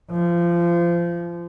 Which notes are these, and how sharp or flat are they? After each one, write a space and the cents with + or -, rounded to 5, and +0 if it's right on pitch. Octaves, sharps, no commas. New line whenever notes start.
F3 -25